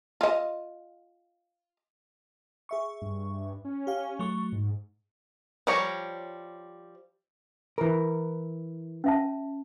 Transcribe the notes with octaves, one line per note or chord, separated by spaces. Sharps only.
F4 D#5
G#4 E5 C#6
G2
C#4
G4 F5
F#3 A3 C#6
G#2
F3 G3 G4 C#5 A#5
E3 A#4
C#4 E5 A5